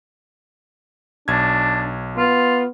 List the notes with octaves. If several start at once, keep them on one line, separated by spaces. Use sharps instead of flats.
B1 D4 G#6
B3 F4